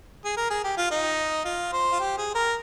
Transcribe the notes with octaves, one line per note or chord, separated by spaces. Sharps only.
G#4
A#4
G#4
G4
F4
D#4
F4
C5
F4
G4
G#4
A#4